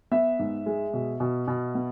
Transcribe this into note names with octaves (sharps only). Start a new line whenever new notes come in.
B3 E5
G#2
G#3
B2
B2
B2
B3